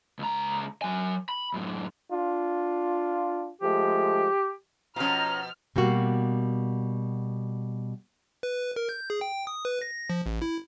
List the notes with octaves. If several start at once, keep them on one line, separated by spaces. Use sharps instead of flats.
C#2 A#5
F#3 G#5
B5
F#2 A2
D4 F4
F3 G#3 A3 G4
B2 F3 C#4 F4 A#5 F6
B2 G3 A#3 F#4
B4
A#4
G6
G#4
G5
D#6
B4
A#6
F3
A1
E4